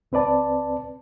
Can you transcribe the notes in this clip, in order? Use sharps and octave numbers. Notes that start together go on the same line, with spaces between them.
C#2 C4 B4 D5 A5